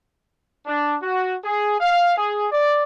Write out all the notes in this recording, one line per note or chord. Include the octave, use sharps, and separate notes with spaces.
D4
F#4
G#4
F5
G#4
D5